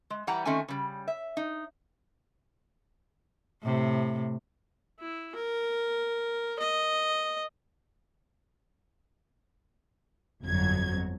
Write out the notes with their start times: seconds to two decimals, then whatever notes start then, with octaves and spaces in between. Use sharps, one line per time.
0.10 G#3
0.27 E3 G3 G4 F#5 A#5
0.45 D#3 A3 C4 C#4 G#5
0.68 C#3 G3
1.08 E5
1.37 D#4
3.63 A2 C3
4.99 E4
5.35 A#4
6.59 D#5
10.42 G1 F2 F#3 G#6